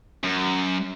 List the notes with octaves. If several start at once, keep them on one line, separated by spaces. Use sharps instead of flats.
F#2